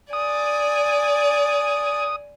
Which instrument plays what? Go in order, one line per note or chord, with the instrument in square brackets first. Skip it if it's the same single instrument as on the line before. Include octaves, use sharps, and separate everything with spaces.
[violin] D5 G#5 [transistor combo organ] D#6